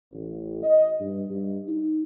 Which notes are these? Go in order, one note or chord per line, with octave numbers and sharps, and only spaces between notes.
A1
D#5
G2
G2
D#4